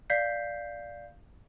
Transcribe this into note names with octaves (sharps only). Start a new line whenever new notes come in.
D5 F5 G6 B6 C7